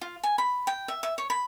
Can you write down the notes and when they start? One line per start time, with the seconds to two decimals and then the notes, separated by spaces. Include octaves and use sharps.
0.01 F4
0.23 G#5
0.38 B5
0.67 G5
0.88 E5
1.03 E5
1.18 C#5
1.30 B5